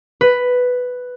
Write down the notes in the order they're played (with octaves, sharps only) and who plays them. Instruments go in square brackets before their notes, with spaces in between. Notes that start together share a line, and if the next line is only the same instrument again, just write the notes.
[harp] B4